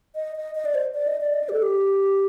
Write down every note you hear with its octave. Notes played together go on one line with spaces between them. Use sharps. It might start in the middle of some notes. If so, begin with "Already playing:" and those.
D#5
D#5
D#5
D5
C5
D5
D#5
D5
D#5
D5
G4
A4
G4